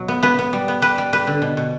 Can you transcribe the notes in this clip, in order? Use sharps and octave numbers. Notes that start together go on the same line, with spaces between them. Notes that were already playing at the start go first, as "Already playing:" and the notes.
Already playing: B2 F#3
B3
B3 B4
B3
G3
B3
G3 B4
G3
G3 B4
D3
B2
B2